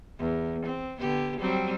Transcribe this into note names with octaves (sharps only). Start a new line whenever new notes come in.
E2
C4
D3 B3 G4
F#3 G3 C4